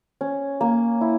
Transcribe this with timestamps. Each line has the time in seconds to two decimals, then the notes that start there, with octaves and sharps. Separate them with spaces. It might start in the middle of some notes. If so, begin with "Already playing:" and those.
0.21 C#4
0.61 A#3
1.01 E4